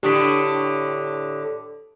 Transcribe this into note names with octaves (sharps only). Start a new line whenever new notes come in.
A2 D3 G4 D#6 B6